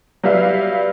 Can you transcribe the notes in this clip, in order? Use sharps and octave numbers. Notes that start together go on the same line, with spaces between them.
F#3 G3 B4 E5 F5